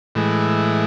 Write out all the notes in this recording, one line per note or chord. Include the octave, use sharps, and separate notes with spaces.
A2 E3 G#3